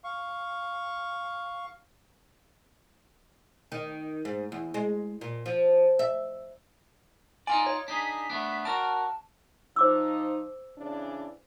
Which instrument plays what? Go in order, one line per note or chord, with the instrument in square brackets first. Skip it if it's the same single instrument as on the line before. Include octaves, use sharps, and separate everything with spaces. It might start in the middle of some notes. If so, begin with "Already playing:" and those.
[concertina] F5 C#6
[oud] D#3
G#2
E2
G#3
A#2
F3
E5
[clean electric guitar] D#4 F4 D5 [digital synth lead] G#5
[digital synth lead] C#5
[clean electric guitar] D4 D#4 G#4 [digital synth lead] B6
[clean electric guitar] A3 B3 D4
[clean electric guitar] F#4 A#4 D5 [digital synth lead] A5
[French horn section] F3 D#4 [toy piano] C5 D6 E6
[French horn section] C#3 E3 D4